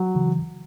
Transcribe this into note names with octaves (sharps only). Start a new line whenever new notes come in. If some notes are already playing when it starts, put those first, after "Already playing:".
Already playing: F#3
C#3 E3